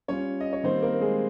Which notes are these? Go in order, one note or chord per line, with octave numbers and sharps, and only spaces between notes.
G3 C#4 F4 C#5
D#5
C#5
D#3 G3 A#3 C4 D#4 C5
A#3 A#4
G#3 G#4